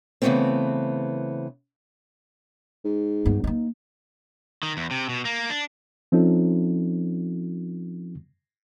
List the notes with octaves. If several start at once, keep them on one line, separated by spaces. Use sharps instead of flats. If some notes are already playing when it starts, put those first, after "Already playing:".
C#3 E3 F#3 A3 B3 C4
G#2
G2 B3
A#3 D#4
D#3
E2
C3
B2
A#3
D4
F3 C4 C#4 D#4 F4 A4